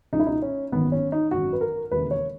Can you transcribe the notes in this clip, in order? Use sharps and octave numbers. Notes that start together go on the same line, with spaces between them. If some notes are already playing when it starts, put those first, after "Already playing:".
C#2 B2 D#4 E4
D#4
C#4
G#1 F#2 D#3 B3
C#4
D#4
G#1 F#2 D#3 F#4
B4
A#4
E1 D#2 C#3 E3 B4
C#5